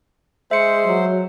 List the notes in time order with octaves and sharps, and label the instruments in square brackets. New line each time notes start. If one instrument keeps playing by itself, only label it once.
[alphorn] G#3 [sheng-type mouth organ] C5 [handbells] E5 C#7
[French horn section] F#3